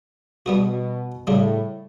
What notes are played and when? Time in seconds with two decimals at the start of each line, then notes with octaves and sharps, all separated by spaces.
0.46 B2 G3 B3 F#4
1.27 A2 C#3 G3 D4